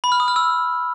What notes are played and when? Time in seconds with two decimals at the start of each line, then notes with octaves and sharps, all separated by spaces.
0.04 B5
0.12 F6
0.20 D#6
0.28 F6
0.36 E6